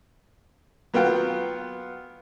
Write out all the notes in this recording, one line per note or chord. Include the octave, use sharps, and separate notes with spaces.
F#3 B3 F4 F#5 G5 F6